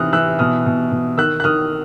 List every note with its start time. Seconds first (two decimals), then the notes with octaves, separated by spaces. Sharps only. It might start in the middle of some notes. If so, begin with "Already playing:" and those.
Already playing: C3 E3 D#6 F6 F#6
0.13 E3 E6 F#6
0.39 B2 D#6 F6
0.66 B2
0.92 B2
1.18 D#3 E6 F#6
1.40 F#6
1.44 D#3 D#6 F6